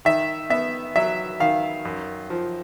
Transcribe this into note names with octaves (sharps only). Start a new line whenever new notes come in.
D#3 E5
B3 E5
F#3 E5
D#3 F5
F#2
F3